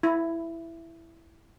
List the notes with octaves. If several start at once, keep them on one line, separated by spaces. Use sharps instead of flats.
E4